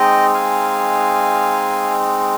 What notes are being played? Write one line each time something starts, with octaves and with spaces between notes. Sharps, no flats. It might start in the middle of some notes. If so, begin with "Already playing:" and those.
Already playing: G#3 C4 D#4 D#5 G5
F5 G#5